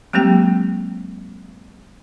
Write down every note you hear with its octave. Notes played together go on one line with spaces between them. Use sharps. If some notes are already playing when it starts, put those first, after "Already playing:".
F#3 G#3 A#3 C4 G4 G5